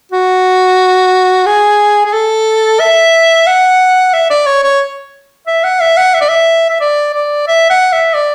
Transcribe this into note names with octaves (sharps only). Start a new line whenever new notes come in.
F#4
G#4
G#4
A4
E5
F#5
E5
D5
C#5
C#5
E5
F#5
E5
F#5
E5
D5
E5
E5
D5
D5
E5
F#5
E5
D5